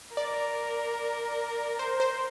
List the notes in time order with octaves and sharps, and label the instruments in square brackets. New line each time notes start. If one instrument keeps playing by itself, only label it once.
[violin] A#4 [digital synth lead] D5
[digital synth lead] C5
C5